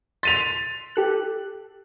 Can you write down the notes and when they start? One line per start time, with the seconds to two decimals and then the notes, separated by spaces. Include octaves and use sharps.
0.23 C6 A6 B6 D#7 F7
0.96 G4 A4 F#6